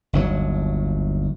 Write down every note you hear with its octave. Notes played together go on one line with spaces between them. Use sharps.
G1 D#2 F#3